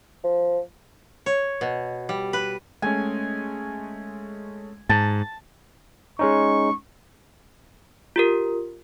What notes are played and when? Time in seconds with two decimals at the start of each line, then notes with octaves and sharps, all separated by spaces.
0.24 F3
1.26 C#5
1.61 B2
2.09 G3
2.33 B4
2.82 G#3 A3 C#4 G#5
4.89 G#2 A5
6.19 G#3 C#4 D#4 C#6
8.16 F4 G4 A#4